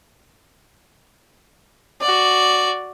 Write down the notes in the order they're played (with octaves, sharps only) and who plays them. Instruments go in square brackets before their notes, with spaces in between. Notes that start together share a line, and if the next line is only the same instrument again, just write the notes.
[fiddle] F#4 D5